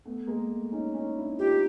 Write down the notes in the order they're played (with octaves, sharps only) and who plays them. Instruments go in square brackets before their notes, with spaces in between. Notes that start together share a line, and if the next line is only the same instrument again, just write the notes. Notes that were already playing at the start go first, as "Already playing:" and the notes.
[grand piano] A3 B3
G#3 A#3
A3
C#4 D#4
C#4 D#4
D4 E4
[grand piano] D#4 F4 [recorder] G4